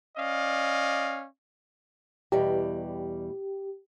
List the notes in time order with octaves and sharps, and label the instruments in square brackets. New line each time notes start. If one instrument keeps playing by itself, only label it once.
[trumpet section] C#4 D5 D#5 F5
[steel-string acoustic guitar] E2 B2 G3 [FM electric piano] G4